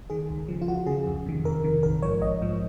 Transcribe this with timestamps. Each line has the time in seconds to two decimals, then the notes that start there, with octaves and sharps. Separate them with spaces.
0.10 D#3 G#4
0.30 C#2
0.48 C#3 F3
0.62 F4
0.68 C#2 F#4
0.86 C#3 F3 G#4
1.07 F2
1.26 C3 D#3
1.44 F2 A#4
1.64 C3 D#3
1.83 A#1 A#4
2.02 G#2 F3 C#5
2.21 A#1 D#5
2.41 G#2 F3